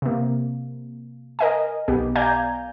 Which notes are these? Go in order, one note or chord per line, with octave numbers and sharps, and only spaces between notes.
C3 A#3
A#4 D#5 G#5
B1 B3 G4
D5 F5 G#5 A#5 G6 G#6